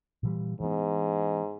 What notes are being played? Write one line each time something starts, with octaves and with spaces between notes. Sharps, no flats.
A#2 E3 G3
G#2 E3 B3